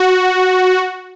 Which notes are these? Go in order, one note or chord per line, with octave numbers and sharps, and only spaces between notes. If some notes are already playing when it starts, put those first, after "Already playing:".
Already playing: F#4